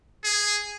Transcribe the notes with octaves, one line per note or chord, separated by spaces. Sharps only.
G#4